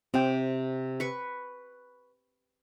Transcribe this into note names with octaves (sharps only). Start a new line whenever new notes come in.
C3 C4 G5
B4 C#6